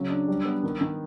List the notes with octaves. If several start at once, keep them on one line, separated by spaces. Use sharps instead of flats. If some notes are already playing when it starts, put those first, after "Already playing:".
Already playing: C#3 F#3
D4
G3
B3
D#3
D#3